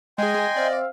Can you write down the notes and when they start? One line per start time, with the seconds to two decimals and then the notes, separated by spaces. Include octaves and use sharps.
0.18 G#3 G#4 D#5 G5 G#5 C6
0.57 C4 D5 E5 F5